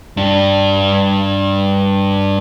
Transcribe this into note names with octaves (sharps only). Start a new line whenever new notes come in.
G2 D4